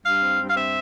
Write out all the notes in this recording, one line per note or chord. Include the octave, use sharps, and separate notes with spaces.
G2 F5
C4
G2
F5
C4 E5